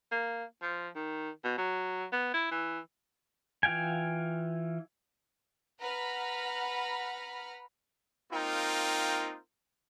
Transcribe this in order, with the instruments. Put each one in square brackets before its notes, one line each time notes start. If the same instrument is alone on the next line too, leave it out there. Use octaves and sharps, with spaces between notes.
[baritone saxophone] A#3
F3
D#3
B2
F#3
B3
E4
E3
[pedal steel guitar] E3 F4 F5 G5 G#5
[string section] B4 F#5 A#5 B5 F6
[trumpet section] A#3 C4 D#4 F4 A#4 G5